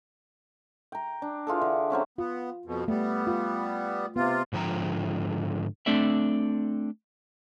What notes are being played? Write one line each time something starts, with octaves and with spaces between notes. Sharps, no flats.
G5 A#5
D4
E3 F4 G#4 A4
D3
F#3 C4 C#4 E5
B3 F4
F2 B2
G3 A3 B3
F4
C3 B3 F4
G#2 D3 F3 G5 A#5
A3 C4 D4 A4 D5 E5